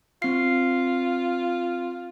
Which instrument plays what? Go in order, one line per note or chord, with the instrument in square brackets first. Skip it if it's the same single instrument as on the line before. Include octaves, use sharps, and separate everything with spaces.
[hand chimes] C4 C7 [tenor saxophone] F4